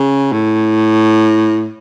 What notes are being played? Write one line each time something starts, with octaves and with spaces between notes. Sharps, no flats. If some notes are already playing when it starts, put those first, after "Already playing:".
Already playing: C#3
A2